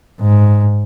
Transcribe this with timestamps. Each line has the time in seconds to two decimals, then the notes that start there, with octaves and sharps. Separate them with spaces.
0.21 G#2